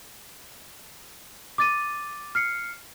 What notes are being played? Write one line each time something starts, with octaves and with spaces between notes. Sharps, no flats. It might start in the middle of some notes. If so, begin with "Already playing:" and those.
D6 A6 D#7
F6 C7 C#7